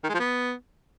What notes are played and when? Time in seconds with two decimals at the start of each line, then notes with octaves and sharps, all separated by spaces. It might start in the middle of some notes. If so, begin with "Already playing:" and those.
0.04 D#3
0.09 G#3
0.14 F3
0.19 B3